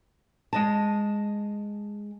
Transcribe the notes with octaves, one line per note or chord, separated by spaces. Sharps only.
G#3 D#5 A5